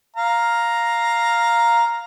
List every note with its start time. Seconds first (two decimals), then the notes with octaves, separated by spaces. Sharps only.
0.17 F5 A#5